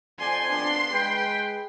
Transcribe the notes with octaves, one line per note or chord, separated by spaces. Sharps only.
F2 C5 D5 G#5 C6
F3 B3 D4
G#3 B4 G5